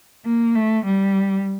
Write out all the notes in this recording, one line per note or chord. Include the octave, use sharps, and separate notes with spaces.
A#3
A3
G3